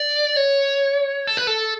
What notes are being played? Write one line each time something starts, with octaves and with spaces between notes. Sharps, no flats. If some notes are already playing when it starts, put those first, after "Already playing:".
Already playing: D5
C#5
A4
B4
A4